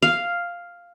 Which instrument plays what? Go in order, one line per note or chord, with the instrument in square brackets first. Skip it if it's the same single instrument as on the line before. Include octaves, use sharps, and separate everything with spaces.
[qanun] F5